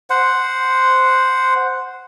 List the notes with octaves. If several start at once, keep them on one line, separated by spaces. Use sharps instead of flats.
C5 F#5